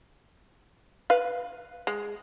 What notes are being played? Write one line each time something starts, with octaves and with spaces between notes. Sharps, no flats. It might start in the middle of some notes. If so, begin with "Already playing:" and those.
B4 F5
G#3